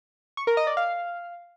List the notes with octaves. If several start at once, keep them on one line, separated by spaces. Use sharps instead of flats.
C#6
A#4
D#5
D5
F5